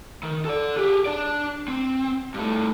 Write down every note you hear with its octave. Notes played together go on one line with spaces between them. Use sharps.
D#3
A4 D5
G4 G#4
D4 D5
C4
G2 A3